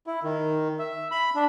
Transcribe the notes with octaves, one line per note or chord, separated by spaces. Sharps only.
E4
D#3
E5
B5
D4